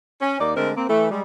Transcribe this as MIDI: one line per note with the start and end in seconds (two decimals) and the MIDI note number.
0.21 0.39 61
0.39 0.53 39
0.39 0.53 58
0.39 0.53 63
0.39 0.53 74
0.55 0.71 50
0.55 0.71 56
0.55 0.71 57
0.55 0.71 60
0.55 0.71 70
0.76 0.88 58
0.76 0.88 60
0.88 1.09 52
0.88 1.09 57
1.10 1.22 55
1.10 1.22 56